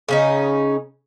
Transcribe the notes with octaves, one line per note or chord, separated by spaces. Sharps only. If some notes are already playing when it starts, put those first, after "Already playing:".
C#3 C#4 D#4